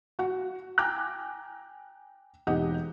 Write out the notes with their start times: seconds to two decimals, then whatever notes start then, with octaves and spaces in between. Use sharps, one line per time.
0.19 F#4 F#5
0.78 G5 G#5 A#5 D6 F#6
2.47 E1 D#4 G4 D#5 F#5